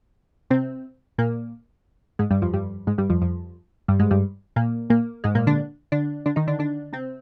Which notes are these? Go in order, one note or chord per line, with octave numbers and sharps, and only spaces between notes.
C3 C4
A#2 A#3
G#2 G#3
G2 G3
F2 F3
G2 G3
G#2 G#3
G2 G3
F2 F3
F2 F3
G2 G3
G#2 G#3
G2 G3
A#2 A#3
A#2 A#3
G#2 G#3
A#2 A#3
D3 D4
D3 D4
D3 D4
D#3 D#4
D3 D4
D3 D4
C3 C4